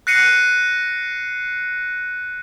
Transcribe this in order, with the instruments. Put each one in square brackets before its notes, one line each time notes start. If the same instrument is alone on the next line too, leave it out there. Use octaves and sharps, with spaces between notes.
[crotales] F#6 A#6 C7 C#7 D#7